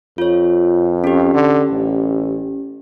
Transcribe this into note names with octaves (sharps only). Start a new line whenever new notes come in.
F2 F4 C#5
C#4 G4
D3
A1